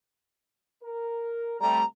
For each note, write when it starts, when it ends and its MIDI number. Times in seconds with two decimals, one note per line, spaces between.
0.83 1.55 70
1.60 1.82 48
1.60 1.82 55
1.60 1.82 57
1.60 1.84 82